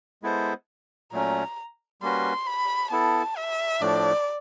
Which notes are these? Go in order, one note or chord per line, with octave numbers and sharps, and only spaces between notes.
G#3 B3 E4 A4 C5
A#2 F#3 A3 C#4 A#5
G3 A#3 C#4 F#4 B4 C6
B5
B3 E4 A4 A5
E5
A2 F3 A3 D4 D5